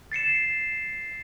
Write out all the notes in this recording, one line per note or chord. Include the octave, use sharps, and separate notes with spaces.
A6 C7 C#7 E7